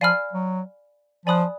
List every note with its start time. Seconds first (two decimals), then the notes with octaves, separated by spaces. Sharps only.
0.01 F3 D5 F5 G#5 B5 F6
0.33 F#3
1.26 F3 D5 G#5 B5 D#6 F#6